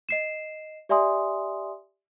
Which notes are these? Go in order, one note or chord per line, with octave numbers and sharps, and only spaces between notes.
D#5 C7 E7
G4 D5 E5 G#5 C6 D#6